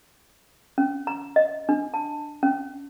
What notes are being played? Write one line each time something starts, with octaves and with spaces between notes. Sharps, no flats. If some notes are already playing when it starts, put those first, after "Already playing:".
C#4
A#5
D#5
D4
A5
C#4